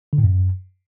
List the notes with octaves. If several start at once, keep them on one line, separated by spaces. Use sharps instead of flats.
D3
A2
F#2